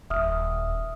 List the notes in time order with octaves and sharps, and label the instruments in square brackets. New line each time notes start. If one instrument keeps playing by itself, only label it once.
[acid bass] D#1 [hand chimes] E5 D#6 F6